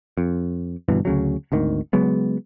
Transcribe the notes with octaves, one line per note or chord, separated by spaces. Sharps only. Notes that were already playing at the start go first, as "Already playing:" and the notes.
F2
G1 G2 B2 E3
D2 C#3 F#3
G#1 D2 D#3
C#3 F#3 G#3 B3